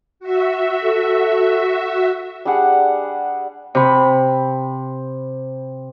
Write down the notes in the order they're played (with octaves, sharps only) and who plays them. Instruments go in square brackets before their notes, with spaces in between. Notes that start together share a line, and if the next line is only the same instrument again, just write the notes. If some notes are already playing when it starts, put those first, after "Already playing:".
[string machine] F#4 E5
[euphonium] A4
[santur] G3 D4 G#4 F#5
[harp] C3 B5